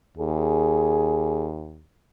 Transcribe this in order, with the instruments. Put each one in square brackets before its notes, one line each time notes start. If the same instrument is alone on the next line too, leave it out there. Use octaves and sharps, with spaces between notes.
[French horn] D#2 [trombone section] G#4